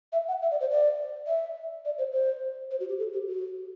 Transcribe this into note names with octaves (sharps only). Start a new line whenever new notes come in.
E5
F#5
E5
D5
C5
D5
E5
D5
C5
C5
C5
F#4
G4
A4
G4
F#4